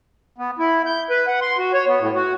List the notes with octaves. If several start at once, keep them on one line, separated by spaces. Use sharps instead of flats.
B3
E4
G6
B4
F#5
C6
F#4
C#5
B3
A2
F#4